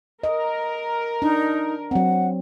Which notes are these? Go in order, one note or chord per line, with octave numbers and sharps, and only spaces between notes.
A#4 D#5
D4 D#4
F#3 C4 F#5